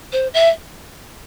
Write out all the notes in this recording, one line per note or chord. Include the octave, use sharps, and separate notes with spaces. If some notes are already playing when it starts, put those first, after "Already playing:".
C5
E5